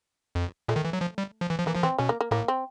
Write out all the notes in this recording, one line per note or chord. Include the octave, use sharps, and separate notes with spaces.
F2
A#2 A3
D#3
E3
F#3
F3
G3
F3
E3
F3
E3 A#3
F3
E3 C4
B2 C#4
A#3
A#3
A2 A#3
C4